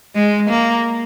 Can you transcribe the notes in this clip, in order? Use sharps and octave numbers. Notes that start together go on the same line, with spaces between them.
G#3
A#3